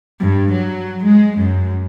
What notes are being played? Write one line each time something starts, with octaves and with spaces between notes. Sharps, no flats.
G2
F#3
G#3
F#2